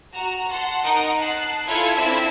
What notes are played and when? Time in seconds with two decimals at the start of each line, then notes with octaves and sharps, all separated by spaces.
0.14 F#4 A#5
0.48 F#5 A5 C6
0.84 D#4 A#4 F#5 D#6 G6 D7
1.18 A5 F#6 C7
1.67 E4 F4 A4 G#5 G#6 C#7
1.95 C4 D4 E4 A4 A5